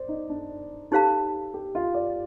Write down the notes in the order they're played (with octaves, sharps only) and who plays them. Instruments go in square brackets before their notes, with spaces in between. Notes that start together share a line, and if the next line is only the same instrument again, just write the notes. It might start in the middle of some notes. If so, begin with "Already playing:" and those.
Already playing: [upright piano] C5 D5
D#4
D4
[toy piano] D#4 G4 C5 F5 A5 [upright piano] A4
[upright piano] G4
F4
D5